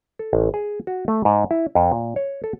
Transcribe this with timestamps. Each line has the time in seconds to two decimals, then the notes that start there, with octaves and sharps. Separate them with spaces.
0.19 A4
0.33 A1
0.54 G#4
0.87 F#4
1.08 A3
1.25 G#2
1.51 E4
1.75 F2
1.92 A#2
2.16 C#5
2.44 A4